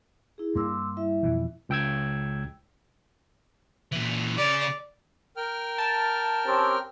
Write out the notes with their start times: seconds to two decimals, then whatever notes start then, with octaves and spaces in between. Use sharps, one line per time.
0.38 E4 G#4
0.55 G2 A#3 C6 D6 E6
0.97 G3 E4 E5
1.23 F2 B2 E3
1.69 C#2 G5 E6 G#6
3.92 A#2 E3
4.37 C#3 D5
5.37 A#4 G5 F6
5.78 A5
6.47 C4 C#4 G4